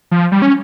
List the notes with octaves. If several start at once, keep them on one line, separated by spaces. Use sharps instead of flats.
F3
G3
C#4